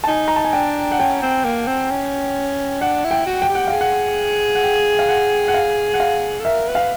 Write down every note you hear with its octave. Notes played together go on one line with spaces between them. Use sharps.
A5
D#4 G#5
A#5
A5
G#5
D4 G5
F#5
C#4 G5
C4
A#3
C4
C#4
D4 F#5
E4
G5
F#4
G5
G4
F#5
F5
G#4
F#5
F#5
G5
F5
F#5
F#5
F5
F#5
F5
A4
A#4 E5
B4
F5